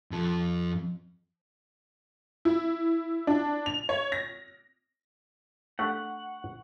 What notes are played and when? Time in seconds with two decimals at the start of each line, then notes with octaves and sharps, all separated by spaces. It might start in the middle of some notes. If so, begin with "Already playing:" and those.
0.11 F2 F3
2.45 E4
3.27 D4
3.66 F7
3.89 C#5
4.12 A#6
5.79 A3 D4 G4 F#5 C#6